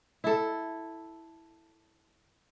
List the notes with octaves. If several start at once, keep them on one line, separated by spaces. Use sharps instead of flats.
E4 A4